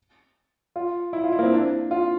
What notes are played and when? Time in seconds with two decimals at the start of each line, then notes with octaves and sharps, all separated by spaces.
0.76 F4
1.13 E4
1.24 F4
1.32 E4
1.39 A#3
1.43 C4
1.53 D4
1.91 F4